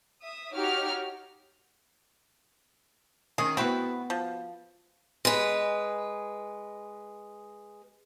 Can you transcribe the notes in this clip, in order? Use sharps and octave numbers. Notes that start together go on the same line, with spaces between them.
E5 D#6
D#4 F#4 G4 C#5 D6 F6
D#3 C#4 G#4
B3 C4 E4 F#4 B4
F3
G#3 B4